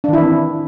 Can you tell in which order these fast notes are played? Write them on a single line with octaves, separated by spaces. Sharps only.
D4 D#3 E4 E3 C4